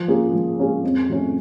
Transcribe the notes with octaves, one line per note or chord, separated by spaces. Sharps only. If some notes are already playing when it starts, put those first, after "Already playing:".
Already playing: F3
A#3 C#4 F4 G#4
F3
A#3 C#4 F4 G#4
F2
C3 F3 A3 C#4